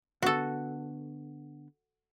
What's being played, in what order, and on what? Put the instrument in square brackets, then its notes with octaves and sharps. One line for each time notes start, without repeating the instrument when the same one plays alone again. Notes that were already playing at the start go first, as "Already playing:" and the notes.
[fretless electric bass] D3 B3 [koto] F#4 A4